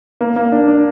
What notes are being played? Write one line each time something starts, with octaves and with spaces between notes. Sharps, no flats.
A#3
A#3
D4
D4